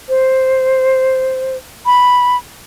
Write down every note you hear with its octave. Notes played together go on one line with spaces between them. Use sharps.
C5
B5